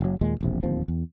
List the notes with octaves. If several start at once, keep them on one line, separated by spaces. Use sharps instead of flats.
F#1 F#3
D#2 A#2 G#3
E1 A#1 C3
D1 D#2 F3 C4
E2